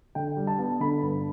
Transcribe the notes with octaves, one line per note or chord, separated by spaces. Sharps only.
D3 G5
G3
A5
B3
D3 B5
G2